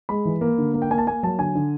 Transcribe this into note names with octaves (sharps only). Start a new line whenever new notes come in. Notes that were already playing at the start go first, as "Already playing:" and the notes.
G#3 B5
E3
A#3
D3
A#3
G5
A#3 G#5
A5
A#3 G#5
F#3 A5
D3 G#5
D3